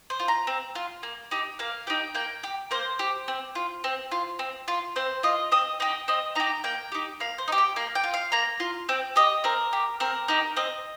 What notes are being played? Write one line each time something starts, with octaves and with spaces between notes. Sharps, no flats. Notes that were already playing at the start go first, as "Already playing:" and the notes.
C5
F4
A#5
C4
F4
A#3
D#4 G4
A#3 F5
D#4 G4 G5
A#3 G5
G4
A#3 C5
G4
C4
F4
C4
F4
C4
F4
C4 C5
F4 D#5
C4 D#5
D#4 G4 D#5
C4 D#5
D#4 G4 A#5
A#3 G5
D#4 G4
A#3 F5
C5
D#4
G4
G5
A#3 F5
G5
F4
F5
A#3 A#5
F4
C4 G5
G4 D#5
C4 A#4
G4
C4 A#4
D#4 G4
C4 D#5